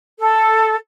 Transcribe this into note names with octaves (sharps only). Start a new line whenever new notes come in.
A4